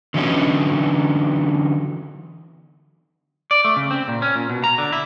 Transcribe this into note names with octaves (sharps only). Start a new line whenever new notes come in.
D3 E3 F#3 B3 C#4 D#4
D5
A3
C#3
C4
A#2
C#4
A#2
B2
A#5
D3
E4